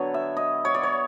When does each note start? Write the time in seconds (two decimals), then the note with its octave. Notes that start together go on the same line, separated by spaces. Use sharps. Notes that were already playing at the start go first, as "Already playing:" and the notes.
Already playing: D3 F#3 B3 C#5
0.14 E5
0.37 D#5
0.65 C#5
0.74 D5
0.83 C#5